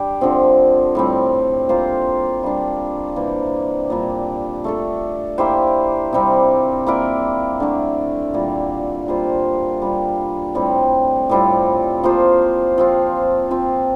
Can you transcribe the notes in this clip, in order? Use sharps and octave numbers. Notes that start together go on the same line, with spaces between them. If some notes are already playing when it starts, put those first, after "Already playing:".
Already playing: G3 D4 G4 D5
D3 F3 C4
A2 G3 C4
A#3 F4 C5
G3 A#3 D4
C3 E3 A#3 D4
A#2 G3 A#3 D4
A3 D4 A4
A#3 E4 G4 C5
C3 G3 C4
A#3 E4 A#4 D5
D3 A3 D4
A#2 G3 A#3
G3 A#3 F4 C5
G3 D4 F4
A2 G3 C4
A2 G3 C4 F4
F3 A#3 F4 C5
F3 C4 F4
F3 C4 F4